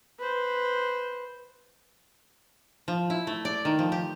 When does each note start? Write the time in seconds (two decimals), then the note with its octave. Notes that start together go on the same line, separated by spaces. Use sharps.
0.19 B4 C5
2.88 F3
3.10 E4
3.27 A3
3.45 D5
3.65 D#3
3.79 F3
3.92 G4